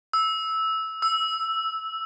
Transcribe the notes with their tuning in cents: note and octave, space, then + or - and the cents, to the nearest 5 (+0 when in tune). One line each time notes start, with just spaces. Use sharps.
E6 -10
E6 +5